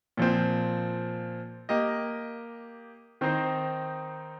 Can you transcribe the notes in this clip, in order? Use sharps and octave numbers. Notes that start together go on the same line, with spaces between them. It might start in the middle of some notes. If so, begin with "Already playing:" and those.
A#2 F3 C4
A#3 G4 D#5
D#3 C4 D#4 C5